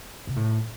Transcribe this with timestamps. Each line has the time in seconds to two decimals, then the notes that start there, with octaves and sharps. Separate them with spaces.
0.27 C3
0.36 A2